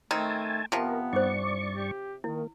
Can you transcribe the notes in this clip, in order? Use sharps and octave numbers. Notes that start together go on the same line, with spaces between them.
D#3 A3 C4 G#5 A5
C3 F3 B3 A#4
G2 D#4 C5 D5 C#6
G4
D#3 A#3 E4